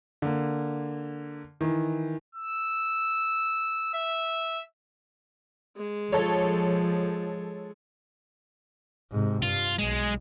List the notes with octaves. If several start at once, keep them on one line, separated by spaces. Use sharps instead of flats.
D3 A#3
D#3 E3
E6
E5
G#3
F3 A4 C#5
G#2 C3
G2 F4
B1 G#3